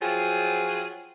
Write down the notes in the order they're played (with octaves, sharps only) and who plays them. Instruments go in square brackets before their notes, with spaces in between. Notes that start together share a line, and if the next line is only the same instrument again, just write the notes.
[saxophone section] F3 F#3 C4 F4 G#4